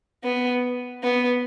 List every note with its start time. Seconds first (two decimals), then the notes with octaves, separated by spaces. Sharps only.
0.24 B3
1.03 B3